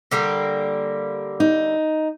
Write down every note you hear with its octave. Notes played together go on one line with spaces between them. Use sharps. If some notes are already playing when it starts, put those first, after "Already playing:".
D3 G3 A#3
D#4